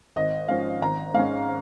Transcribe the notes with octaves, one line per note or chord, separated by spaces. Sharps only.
G#1 D#5
G#2 F3 C#4 F5
G#1 A#5
G#2 G#3 C#4 F5